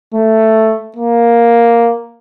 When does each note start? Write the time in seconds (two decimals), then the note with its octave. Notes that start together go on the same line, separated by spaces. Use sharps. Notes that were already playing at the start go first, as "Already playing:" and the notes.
0.14 A3
0.96 A#3